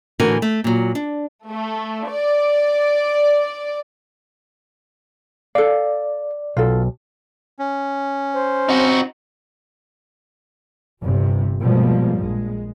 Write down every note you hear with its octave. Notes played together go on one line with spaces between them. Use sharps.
A2 D3 E3 F#4 A#4 G#5
A3
A#2 F#3
D4
A3
D5
A4 D5 F5
B1 F4 A4
C#4
C5
C4 D#4 F#4
G1 G2 C3
B2 F3 G3 G#3 A#3
A#1 G#3